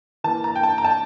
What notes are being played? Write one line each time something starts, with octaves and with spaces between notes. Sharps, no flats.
E3 A#3 A5
A#5
G5
A5
A#5
A5